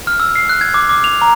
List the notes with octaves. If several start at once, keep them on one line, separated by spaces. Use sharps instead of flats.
F6
E6
C7
F#6
G#6
D6
D6
F7
A#5